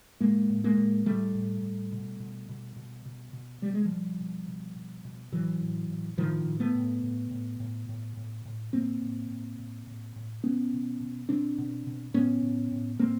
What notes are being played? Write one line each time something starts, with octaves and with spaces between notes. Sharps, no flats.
A2 G#3 A#3
A2
G#3 A#3
A2
A2 G3 A3
A2
A2
B2
B2
B2
B2
B2
B2
B2 G3
G#3
F3 G3
B2
B2
B2
B2
B2
A2 E3 F#3
A2
A2
A2 D#3 F3
A2
A3 B3
A2
A2
A2
A2
A2
A2
A2
A2 A#3 C4
A2
A2
A2
A2
A2
B2 B3 C#4
B2
B2
B2 C4 D4
B2
B2
A2 B3 C#4
A2
A2
A2 A#3 C4